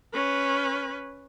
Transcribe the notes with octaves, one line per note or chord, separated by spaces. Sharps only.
C#4 B4